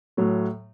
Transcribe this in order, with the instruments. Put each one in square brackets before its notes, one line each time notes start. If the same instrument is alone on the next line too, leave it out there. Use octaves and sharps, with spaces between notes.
[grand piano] A2 F#3 A3